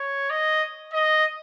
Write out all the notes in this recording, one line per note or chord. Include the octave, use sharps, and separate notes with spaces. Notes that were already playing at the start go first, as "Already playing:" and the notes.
Already playing: C#5
D#5
D#5